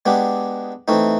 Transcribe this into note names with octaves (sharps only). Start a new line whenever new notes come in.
G#3 B3 D4 G4
E3 A3 C4 D#4